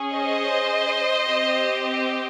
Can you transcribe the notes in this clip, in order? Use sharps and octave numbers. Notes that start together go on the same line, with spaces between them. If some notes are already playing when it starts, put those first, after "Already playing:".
Already playing: C#4 G#4
C5 D#5
C4 G4